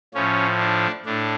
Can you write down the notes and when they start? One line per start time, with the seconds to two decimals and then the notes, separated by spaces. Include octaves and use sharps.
0.14 A2 F3 C#4
0.60 D4
1.06 A2 D4